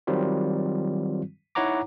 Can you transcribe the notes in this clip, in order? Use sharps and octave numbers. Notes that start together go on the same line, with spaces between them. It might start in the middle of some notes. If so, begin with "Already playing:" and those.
D#3 F#3 G3 C4 F4
D#4 E4 C#5 F#5 A#5 D6